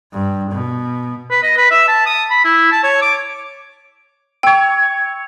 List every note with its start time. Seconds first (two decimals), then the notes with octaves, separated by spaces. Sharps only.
0.13 G2
0.52 B2
1.30 B4
1.43 D#5
1.57 B4
1.71 E5
1.88 A5
2.06 D#6
2.30 B5
2.44 E4
2.72 A5
2.84 C#5
3.02 D6
4.43 C#5 G5 E6